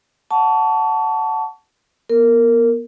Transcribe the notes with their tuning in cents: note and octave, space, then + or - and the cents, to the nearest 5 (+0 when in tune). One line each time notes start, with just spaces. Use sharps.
F#5 +0 A5 +0 C#6 +35
B3 -40 A#4 -15